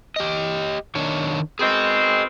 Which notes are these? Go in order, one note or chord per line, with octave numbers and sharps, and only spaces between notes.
G4 D#5
D#3 D4 C#5
B2 D#3 C4 G#4 D#5